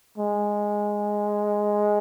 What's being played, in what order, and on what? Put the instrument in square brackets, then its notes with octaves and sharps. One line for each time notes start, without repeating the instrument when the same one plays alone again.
[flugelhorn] G#3